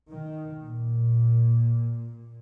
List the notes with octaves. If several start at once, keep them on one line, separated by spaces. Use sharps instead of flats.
D#3
A#2